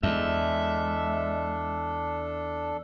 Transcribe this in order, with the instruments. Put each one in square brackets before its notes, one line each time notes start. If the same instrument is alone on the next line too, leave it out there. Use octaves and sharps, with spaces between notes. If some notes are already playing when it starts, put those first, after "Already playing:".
[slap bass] E2 [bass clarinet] G#3 [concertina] D4 A4 [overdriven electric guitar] E5